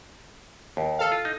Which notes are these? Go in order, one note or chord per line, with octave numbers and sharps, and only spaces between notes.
D#2
A4 F5
F4
D#4